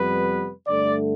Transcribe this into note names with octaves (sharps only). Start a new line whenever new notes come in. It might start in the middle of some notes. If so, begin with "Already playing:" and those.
Already playing: F2 C3 G3 B3 B4
G2 D3 A3 D5